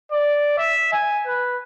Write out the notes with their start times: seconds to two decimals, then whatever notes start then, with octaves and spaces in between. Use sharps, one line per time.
0.12 D5
0.58 E5
0.92 G#5
1.27 B4